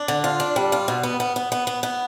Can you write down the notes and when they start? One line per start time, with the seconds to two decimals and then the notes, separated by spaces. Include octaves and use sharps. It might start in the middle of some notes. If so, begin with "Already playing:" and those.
Already playing: D4
0.08 D3
0.24 F4
0.40 D4
0.56 G3
0.72 F4
0.88 B2
1.03 B3
1.20 B3
1.36 B3
1.52 B3
1.67 B3
1.83 B3